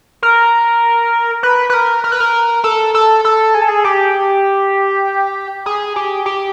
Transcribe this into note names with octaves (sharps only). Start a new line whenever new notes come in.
A#4
B4
B4
A#4
A#4
B4
A#4
A4
A4
A4
G#4
A4
G#4
G4
G#4
G4
G4